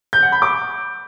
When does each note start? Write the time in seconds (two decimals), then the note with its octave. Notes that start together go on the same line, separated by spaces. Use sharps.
0.13 G6
0.23 F#5
0.32 B5
0.42 D6